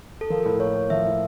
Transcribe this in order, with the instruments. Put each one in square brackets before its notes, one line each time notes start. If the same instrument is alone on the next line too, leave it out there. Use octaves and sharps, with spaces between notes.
[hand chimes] A4
[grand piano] F3 [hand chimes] A#4
[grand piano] A2
[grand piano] A#3 [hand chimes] C#5
[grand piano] A2
[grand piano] F3 [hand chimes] E5
[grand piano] A2